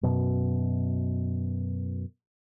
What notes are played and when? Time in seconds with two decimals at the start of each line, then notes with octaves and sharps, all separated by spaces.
0.03 F#2 B2